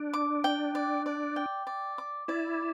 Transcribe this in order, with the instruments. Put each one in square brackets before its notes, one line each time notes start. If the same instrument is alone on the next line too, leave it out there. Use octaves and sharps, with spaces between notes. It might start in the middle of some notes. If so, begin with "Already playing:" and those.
Already playing: [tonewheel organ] D4
[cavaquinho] D6
G5
D5
D5
G5
D5
D6
[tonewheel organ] E4 [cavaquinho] D5